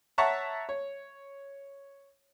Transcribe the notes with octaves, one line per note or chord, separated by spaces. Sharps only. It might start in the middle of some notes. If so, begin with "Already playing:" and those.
C#5 E5 F#5 A5 A#5 C#6
C#5